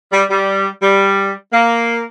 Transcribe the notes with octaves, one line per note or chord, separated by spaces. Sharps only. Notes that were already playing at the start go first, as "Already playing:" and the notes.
G3
G3
G3
A#3